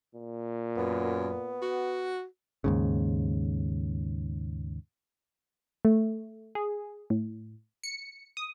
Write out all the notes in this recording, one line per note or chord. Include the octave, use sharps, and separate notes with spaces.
A#2
F#2 B3
F#4
D#2 G#2 C#3
A3
G#4
A2
C#7
D#6